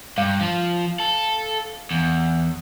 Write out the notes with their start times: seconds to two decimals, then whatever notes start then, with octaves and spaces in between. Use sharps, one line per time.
0.18 G2 F5
0.41 F3
1.00 A4
1.91 E2